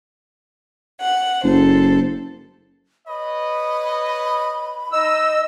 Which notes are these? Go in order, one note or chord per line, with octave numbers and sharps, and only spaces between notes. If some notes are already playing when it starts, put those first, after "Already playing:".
F#5
F#1 A4 C5
B4 C#5 D#5 B5
D#4 D#5 E6